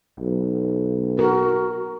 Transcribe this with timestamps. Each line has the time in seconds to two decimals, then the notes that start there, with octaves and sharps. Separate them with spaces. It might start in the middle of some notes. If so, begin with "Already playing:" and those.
0.19 B1
1.19 F#4 A#4